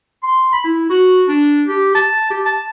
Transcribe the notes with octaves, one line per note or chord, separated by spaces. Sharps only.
C6
B5
E4
F#4
D4
G4
A5
G4
A5